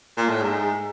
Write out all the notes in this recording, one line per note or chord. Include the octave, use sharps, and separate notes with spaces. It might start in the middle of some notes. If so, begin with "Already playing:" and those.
A#2
A2
G#2